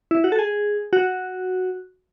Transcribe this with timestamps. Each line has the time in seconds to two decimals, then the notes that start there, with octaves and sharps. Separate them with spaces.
0.11 E4
0.24 F#4
0.32 A4
0.39 G#4
0.93 F#4